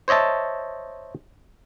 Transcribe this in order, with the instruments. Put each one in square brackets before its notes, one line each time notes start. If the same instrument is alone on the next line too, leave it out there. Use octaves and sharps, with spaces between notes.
[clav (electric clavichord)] C5 C#5 D#5 E5 A5